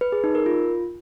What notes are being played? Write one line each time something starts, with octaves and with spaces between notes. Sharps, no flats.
B4
G#4
D#4
A#4
F4